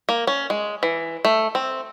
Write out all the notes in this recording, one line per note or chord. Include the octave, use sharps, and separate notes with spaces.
A#3
C#4
G#3
E3
A3
C4